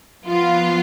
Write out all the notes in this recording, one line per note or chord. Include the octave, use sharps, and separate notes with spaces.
F3 B3 F4